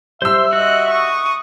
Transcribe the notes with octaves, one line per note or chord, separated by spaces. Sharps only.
G3 C5 E5 C6 E6
F#4 D#5 F#6
C#6 D#6